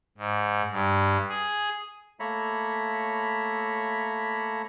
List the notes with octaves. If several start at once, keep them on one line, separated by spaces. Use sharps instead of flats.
G#2
G2
G#4
A3 A#3 C#5 E5 A#5 B5